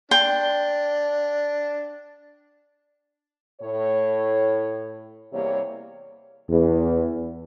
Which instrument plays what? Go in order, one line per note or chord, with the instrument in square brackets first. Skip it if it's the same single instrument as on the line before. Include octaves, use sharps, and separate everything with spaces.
[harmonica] D4 [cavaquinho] G5 C6
[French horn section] A2 C#5
E2 C3 G3 A#3 C#5
[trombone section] E2